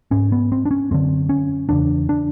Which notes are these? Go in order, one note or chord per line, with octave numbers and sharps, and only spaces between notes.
G#2 C#4
B3
C4
D4
C#4
F#2 D3 C4
C#4
E2 C#3 D4
D4